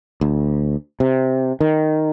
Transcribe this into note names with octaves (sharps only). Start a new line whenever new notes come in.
D2
C3
D#3